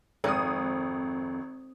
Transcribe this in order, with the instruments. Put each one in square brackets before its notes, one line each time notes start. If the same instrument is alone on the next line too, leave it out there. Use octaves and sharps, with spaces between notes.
[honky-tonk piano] G#1 D#6 [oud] F2